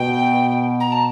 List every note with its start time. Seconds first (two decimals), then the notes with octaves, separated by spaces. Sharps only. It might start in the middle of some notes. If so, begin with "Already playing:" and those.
Already playing: B2 G5
0.80 A#5
0.92 A5